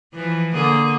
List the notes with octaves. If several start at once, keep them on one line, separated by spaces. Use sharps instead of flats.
E3 F3
D3 A#3 G#4